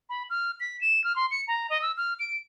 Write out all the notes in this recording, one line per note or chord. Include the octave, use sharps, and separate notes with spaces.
B5
F6
B6
E7
F6
C6
C#7
A#5
D#5
E6
F6
D7